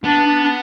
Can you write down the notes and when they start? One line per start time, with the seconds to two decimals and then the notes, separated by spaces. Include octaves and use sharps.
0.04 B3 D4
0.26 D4
0.44 D4